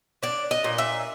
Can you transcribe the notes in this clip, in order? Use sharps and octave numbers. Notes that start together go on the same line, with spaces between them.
D4 D5
D#5
A#2
E5